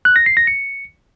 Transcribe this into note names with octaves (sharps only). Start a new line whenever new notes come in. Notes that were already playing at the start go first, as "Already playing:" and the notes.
F#6
A#6
C7
A#6
C#7